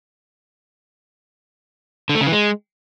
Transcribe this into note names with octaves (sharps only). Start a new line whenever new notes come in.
D3
A3
C#3
E3
G#3